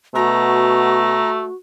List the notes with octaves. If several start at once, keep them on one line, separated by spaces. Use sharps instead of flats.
B2 A3 F#4 A#5